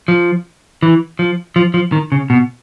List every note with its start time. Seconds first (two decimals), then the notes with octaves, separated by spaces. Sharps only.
0.08 F3
0.83 E3
1.19 F3
1.56 F3
1.74 F3
1.92 D#3
2.12 C#3
2.30 B2